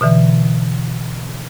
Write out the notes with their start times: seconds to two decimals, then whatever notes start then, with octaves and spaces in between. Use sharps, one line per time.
0.01 B2 D3 E3